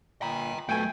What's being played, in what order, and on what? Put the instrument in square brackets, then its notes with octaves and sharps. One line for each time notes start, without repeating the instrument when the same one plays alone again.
[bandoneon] A#2 B5 [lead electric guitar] G5 A#5
[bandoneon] F2 B2 [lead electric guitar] F#3 A3 [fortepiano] G5 G#5